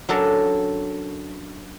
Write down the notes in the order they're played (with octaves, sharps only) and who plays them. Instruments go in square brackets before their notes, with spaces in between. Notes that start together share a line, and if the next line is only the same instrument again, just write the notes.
[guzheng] F#3 C#4 D4 A4 A#4 A5